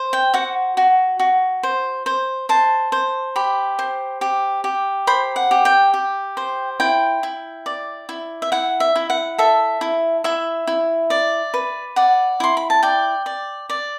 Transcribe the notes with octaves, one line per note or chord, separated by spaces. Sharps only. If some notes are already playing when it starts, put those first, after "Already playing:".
Already playing: C5
G5
F#4 F#5
F#4
F#4
C5
C5
C5 A5
C5
G4 B5
C5
G4
G4
C5 B5
F#5
G4
G5
G4
C5
E4 G5
E4
D5
E4
E5
E4 F#5
E5
E4
F#5
A4 E5
E4
E4 E5
E4
D5
B4
D5 F#5
E4 C6
B5
A5
D5 G5
D5
D5